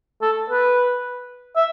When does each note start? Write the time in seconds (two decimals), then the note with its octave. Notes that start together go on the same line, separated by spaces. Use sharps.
0.22 A4
0.50 B4
1.56 E5